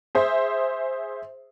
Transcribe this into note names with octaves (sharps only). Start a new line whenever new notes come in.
G#4 C5 E5 C6